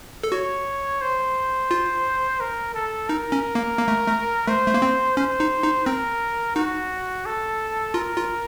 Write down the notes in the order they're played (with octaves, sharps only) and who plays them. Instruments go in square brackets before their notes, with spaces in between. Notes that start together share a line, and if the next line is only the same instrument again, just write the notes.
[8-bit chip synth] A4
[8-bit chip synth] F#4 [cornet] C#5
[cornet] C5
[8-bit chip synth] F4
[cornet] A#4
A4
[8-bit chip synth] D#4 [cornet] A#4
[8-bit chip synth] C#4
A#3
A#3
A3
A3
[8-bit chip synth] A3 [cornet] C5
[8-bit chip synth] A3
A#3
C4
[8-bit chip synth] C#4 [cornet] C5
[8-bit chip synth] D#4
D#4
[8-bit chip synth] C4 [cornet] A#4
[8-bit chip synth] D#4 [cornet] F#4
[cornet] A4
[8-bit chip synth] F4 [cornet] A#4
[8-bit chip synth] F4